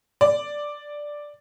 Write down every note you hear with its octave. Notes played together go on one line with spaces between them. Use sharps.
D5